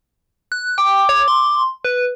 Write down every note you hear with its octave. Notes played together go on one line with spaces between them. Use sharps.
F#6
G5 D6
C#5
C6
B4